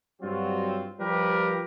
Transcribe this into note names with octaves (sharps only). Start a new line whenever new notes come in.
G2 F#3 G3 C4 F4 F#4
F3 G3 F4 G4 A#4 B4